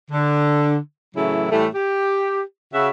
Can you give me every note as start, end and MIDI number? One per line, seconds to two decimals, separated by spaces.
0.11 0.76 50
1.15 1.48 45
1.15 1.48 49
1.15 1.48 52
1.15 1.48 54
1.15 1.48 57
1.15 1.48 64
1.51 1.66 45
1.51 1.66 52
1.51 1.66 55
1.51 1.66 57
1.74 2.41 67
2.74 2.89 49
2.74 2.89 66
2.74 2.89 76